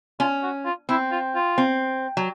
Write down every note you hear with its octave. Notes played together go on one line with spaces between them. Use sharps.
C#4 F4
F#4
F4
C4 E4
F4
F4
C4
F#3